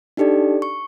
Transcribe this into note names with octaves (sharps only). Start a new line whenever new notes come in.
D4 D#4 G4 A4 D5
C#6